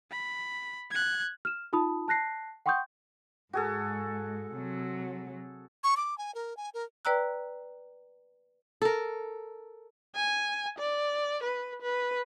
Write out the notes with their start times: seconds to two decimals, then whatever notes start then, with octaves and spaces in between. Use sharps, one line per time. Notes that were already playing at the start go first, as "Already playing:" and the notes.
0.11 B5
0.91 F#6 G#6
1.45 F6 E7
1.73 D#4 F4 A5 B5 D#6
2.08 A5 F#6 A#6 C7
2.66 F#5 G5 C6 C#6 D#6 G6
3.53 G#2 F#4 G#4 A4
4.55 C3 F#3
5.84 C#6
5.97 D6
6.18 G#5
6.35 A#4
6.57 G#5
6.74 A#4
7.05 B4 D5 G5 A#5 E6 F#6
8.82 A4 A#4
10.15 G#5
10.79 D5
11.43 B4
11.82 B4